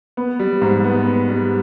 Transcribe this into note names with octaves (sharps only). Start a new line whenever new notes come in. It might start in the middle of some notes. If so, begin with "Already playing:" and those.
B3
G3
G#2
B3
B3
G3